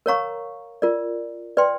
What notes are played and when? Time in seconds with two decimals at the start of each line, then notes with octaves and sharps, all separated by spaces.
0.06 A#4 C#5 F5 A#5 C#6
0.82 F4 A#4 D5
1.57 B4 D5 G5 C6